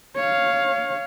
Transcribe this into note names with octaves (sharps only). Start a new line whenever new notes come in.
C#5 F5